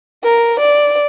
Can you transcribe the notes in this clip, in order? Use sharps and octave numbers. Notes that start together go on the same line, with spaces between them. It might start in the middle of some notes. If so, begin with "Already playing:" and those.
A#4
D5